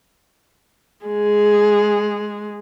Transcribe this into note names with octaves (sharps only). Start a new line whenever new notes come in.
G#3 G#4